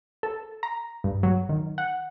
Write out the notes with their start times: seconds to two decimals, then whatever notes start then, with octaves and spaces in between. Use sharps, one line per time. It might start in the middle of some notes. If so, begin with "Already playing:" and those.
0.23 A4
0.63 A#5
1.04 G2
1.23 F#3
1.49 D#3
1.78 F#5